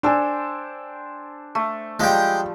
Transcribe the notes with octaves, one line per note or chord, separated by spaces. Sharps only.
D4 A4 C5 G5 G#5
A3
F3 G3 G#3 G5